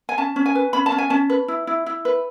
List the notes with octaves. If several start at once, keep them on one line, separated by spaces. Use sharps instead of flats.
G#5
C#4 A5
C#4
G#5
B4
C#4 B5
A5
C#4
G#5
C#4 A5
B4
E4
E4
E4
B4